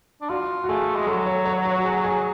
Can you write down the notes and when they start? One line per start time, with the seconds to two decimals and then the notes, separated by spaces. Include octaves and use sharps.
0.21 D4
0.29 F4 F#4
0.64 F#4
0.69 A3 G#4
0.96 G#3
1.07 F#3 A4
1.26 C#5
1.46 C#5
1.65 C#5
1.79 F#4
1.85 G#4
2.04 G#4